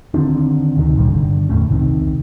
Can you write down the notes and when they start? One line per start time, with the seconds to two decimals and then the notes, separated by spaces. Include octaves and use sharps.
0.14 D3 D#3 C4 D4
0.77 D2 C3 D#3
0.96 G1 A#2 G3
1.09 G1 D3
1.49 E2 A2 A3 C#4
1.69 C2 C3 D#3